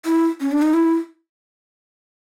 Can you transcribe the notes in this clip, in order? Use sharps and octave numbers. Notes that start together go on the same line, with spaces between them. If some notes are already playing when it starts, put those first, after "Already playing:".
E4
C#4
D4
D#4
E4